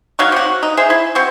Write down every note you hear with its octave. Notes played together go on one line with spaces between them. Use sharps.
F#3 D#4 F5 C#6
C3 F#4
D#4
G#4 C5 E5
E4
C4 F#4